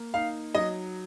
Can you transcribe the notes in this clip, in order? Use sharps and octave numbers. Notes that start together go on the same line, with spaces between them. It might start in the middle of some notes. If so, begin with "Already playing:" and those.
Already playing: A#3
D#4 F5
F#3 D#5